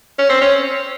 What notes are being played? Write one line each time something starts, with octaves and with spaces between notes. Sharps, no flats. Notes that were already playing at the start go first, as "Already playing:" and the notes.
C#4
C4
C#4